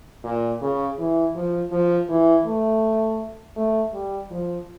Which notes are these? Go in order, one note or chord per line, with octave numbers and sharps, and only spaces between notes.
A#2
C#3
E3
F3
F3
E3
A3
A3
G3
F3